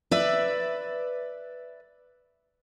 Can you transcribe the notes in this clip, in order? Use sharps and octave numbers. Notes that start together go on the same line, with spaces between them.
B4 D5 E5